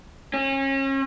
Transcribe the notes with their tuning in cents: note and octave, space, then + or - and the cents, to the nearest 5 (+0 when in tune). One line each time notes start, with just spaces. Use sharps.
C#4 -35